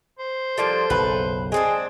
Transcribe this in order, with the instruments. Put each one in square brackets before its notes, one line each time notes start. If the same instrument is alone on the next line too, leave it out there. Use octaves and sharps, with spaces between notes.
[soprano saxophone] C5
[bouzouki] F3 G3 A#3 [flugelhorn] A4
[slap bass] F#1 B1 [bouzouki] B4
[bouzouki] G#3 C4 D4 [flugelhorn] G#4